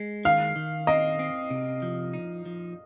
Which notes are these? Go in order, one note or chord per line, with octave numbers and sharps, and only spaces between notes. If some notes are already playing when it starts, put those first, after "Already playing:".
Already playing: G#3
D#3 F5
D#3
C4 D#5
C4
C3
F3
D#4
F3